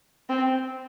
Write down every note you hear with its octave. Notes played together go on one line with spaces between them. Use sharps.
C4